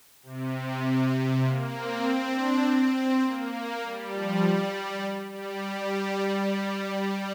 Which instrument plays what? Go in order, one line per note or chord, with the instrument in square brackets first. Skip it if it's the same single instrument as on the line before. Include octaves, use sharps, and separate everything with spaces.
[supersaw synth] C3
A#3
C4
D4
C4
A#3
G3
F3
G3
G3
G3
G3